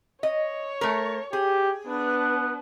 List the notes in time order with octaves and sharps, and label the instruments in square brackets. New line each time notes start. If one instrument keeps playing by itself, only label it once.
[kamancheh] C#5 [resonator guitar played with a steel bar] D#5
[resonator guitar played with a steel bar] A3 A#4
[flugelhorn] G4 [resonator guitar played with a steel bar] G#4
[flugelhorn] B3 [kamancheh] D4 B4